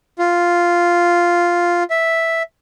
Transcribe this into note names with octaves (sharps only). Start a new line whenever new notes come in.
F4
E5